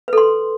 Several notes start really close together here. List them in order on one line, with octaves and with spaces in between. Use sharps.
B4 A4 C6